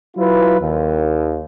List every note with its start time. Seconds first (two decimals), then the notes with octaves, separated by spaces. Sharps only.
0.17 F#3 E4 F4 B4
0.60 D#2